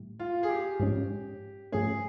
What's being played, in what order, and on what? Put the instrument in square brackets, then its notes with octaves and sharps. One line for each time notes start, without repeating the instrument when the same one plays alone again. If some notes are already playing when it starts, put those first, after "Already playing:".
Already playing: [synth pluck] A2 E3 G3
[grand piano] F4
G#4
G4
[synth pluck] G#2 F3 G#3 C#4
[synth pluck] G#2 F3 A3 C#4 [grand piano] G#4